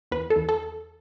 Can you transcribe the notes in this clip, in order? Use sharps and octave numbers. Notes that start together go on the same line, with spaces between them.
E2 B4
A4
E2
A4